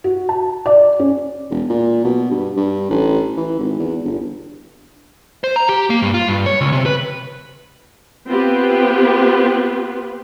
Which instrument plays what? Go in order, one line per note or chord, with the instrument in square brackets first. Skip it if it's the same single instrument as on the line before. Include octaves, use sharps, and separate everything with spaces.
[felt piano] F#4
A5
D5
C#4
[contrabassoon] E1
A#2
B2
G2
G2
A1
E3
G#1
E2
G1
[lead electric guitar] C5
A#5
G4
A#3
G2
F4
G2
C#5
C#2
C3
B4
[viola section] B3 C4 F4 G4 B4